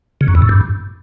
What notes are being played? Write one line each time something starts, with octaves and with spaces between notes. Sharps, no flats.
C#3
F#2
E2
A2
G2